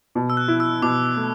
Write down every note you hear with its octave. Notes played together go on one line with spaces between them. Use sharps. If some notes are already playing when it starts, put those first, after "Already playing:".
B2
E6
F#6
E4
E6
B2 D6
A3